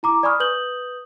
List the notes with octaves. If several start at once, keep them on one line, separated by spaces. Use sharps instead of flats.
E4 A#5 D6
D5 G#5 B5 C#6 D#6 F6
B4 D#6 G6 F#7 G7